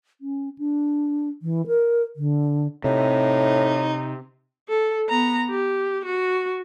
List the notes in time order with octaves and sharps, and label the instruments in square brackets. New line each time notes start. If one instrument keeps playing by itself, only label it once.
[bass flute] C#4
D4
E3
A#4
D3
[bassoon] A2 [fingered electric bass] C3 [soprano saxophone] D#4
[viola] A4
B3 A#5
G4
F#4